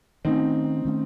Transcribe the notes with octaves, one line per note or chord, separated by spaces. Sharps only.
D#3 A3 C4 C#4 D#4
D#3 A3 C#4